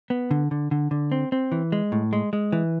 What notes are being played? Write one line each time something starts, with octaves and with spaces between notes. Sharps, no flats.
B3
D3
D3
D3
D3
C4
C4
E3
G#3
A2
G#3
G#3
E3